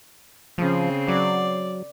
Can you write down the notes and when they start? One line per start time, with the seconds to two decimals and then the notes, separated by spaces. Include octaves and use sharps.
0.58 C#3 F3 C4
1.08 F#3 D5